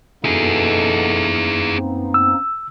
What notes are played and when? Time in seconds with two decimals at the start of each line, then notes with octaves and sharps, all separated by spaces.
0.24 F#2 B2 A#3 D#4 E4 G#4 A4
1.75 B3 C4
2.14 E6